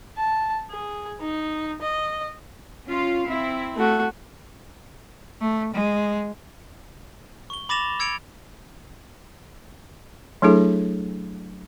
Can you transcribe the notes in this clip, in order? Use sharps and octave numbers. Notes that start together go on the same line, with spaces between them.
A5
G#4
D#4
D#5
C#4 F4 F5
C4 E4
A3 F#4
A3
G#3
C#6 G7
B5 D6 A6 A#6 E7 F7
E6 G#6 C#7 D7 F7
F#3 A3 D4 E4 G#4 A4